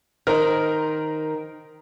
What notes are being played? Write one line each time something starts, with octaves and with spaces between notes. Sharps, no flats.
D#3 A#4 C5 A#5